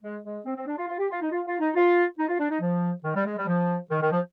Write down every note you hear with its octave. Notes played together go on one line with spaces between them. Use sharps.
G#3
G#3
C4
C4
D4
F4
F4
G4
F4
D#4
F4
F4
D#4
F4
D#4
F4
D4
D#4
F3
D#3
G3
G#3
G3
F3
D#3
D#3
F3